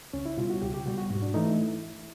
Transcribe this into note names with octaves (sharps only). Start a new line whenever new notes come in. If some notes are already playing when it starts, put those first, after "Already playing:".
C#2 C#4
E4
B2 G3 F4
F#4
C#2 G4
G4
B2 G3 F#4
F#4
G#2 F#4
D4
E3 A3 D#4
E4